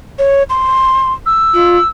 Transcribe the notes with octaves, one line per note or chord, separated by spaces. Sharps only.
C#5
C6
E6
F4